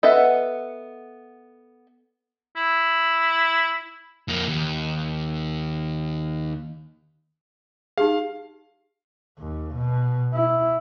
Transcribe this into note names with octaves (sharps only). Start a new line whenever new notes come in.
B3 A4 D#5 E5 F#5
E4
F2 A#3
D#2
D#4 G4 G#4 F5
D#2
B2
E4